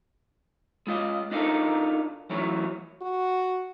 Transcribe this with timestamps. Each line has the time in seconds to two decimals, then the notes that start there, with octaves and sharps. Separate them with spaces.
0.87 G#3 F4 D#5
1.31 D4 D#4 F4 F#4 A4 A#4
2.30 E3 F#3 A3 C#4 E4 C#5
3.01 F#4